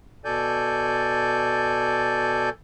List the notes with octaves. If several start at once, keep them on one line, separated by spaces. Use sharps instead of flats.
B2 A4 D5 G#5 G6